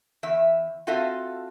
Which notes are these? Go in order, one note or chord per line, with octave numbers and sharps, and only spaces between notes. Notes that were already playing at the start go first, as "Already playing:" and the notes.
E2 E5
C4 F4 F#4 A4 E5 F5